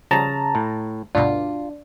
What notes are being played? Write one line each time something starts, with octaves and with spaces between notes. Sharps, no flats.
C#3 F3 G3 A5 A#5
A2
D2 G2 B2 D4 F4